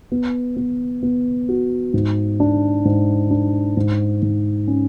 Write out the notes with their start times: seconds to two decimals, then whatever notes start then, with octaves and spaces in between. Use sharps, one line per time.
0.12 B3
0.56 B3
1.03 B3
1.49 F#4
1.94 G#2
2.40 D4
2.85 G#2
3.31 D4
3.77 G#2
4.22 G#2
4.68 C#4